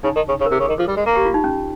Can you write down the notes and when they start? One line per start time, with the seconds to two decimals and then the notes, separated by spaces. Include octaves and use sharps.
0.03 C#3 D#4
0.15 D#3
0.29 C#3
0.40 C#3
0.46 A#4
0.51 C3 G#4
0.59 C#3
0.66 D#3 G#4
0.78 F3 G#4
0.88 G3
0.96 G#3
1.06 A#3
1.15 G4
1.25 F4
1.34 D#4
1.44 C#4